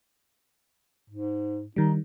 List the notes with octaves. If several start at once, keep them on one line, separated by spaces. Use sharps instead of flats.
G#2
D#3 G3 D#4